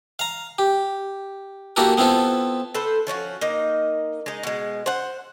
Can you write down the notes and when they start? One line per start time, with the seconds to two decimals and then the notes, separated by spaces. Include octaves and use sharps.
0.19 F5 A#5
0.58 G4
1.76 A#3 E4 F#4 G4 A4 A#4
1.97 B3 C4 E4 F4 A4
2.75 A4 B4 C5
3.07 F3 C#4 D#4 F#4
3.41 A#3 D#4 D#5
4.26 G#3 D#4
4.43 B2 G#3
4.86 C5 F#5